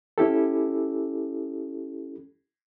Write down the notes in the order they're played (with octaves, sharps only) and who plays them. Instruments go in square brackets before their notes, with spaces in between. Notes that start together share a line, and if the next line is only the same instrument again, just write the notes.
[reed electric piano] C#4 E4 G4 A4